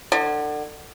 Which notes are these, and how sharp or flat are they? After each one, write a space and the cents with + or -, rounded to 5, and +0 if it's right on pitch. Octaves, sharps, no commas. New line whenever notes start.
D3 +30